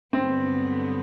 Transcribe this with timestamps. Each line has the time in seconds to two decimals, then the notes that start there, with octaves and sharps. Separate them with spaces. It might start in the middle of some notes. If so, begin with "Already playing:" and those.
0.13 G2 D3 F#3 B3 C4